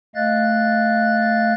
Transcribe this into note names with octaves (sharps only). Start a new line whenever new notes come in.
A3 D#5 F5 F#6 A6